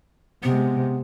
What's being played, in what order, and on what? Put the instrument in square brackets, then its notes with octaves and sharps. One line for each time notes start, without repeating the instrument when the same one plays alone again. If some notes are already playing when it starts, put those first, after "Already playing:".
[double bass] C3 G#3 [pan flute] B3